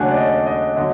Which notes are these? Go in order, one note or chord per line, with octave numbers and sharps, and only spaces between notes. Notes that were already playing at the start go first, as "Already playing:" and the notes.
Already playing: D#2 C#3 F#3 A3 D4 F#5 G#5
D5
D#5
D#5
D3 F#3 D#5